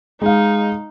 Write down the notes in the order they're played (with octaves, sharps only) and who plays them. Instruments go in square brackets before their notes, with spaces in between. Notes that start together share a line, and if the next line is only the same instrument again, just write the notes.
[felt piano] G#3 F5 [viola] D#4